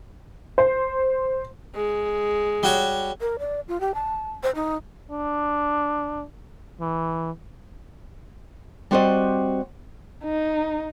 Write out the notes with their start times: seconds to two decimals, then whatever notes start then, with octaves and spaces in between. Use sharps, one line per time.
0.58 C5
1.75 G#3
2.63 G3 F#4 C#5
3.20 A#4
3.39 D5
3.68 F4
3.81 G4
3.94 A5
4.43 C5
4.55 D#4
5.11 D4
6.81 E3
8.91 G3 C4 F#4 C5 D5 D#5
10.25 D#4